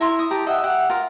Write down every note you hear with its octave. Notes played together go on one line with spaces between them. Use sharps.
E4 A#4 A#5 C6
D#6
G4 A5 A#5
D#5 E5 F#5 G5
G4 F#5
F4 A#4